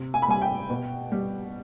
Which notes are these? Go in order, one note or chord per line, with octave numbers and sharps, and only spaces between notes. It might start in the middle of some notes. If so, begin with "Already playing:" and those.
Already playing: C3
G#5
B5
G3 G#5
G5
B2
G3